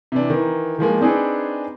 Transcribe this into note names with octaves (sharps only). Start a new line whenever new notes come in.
C3 E3 D4
D#3 E3
D#3 F3 G#3 A#3
C4 D4 D#4 G#4 B4